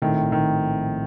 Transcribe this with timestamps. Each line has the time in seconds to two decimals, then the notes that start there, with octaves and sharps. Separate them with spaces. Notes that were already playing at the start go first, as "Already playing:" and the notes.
0.02 A#1 A2 D#3 F3 A3 C4
0.32 D#3